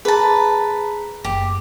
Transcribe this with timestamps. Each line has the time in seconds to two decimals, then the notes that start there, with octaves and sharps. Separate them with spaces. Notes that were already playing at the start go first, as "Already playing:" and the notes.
0.05 G#4 B4 A5 A#5
1.24 F#1 G4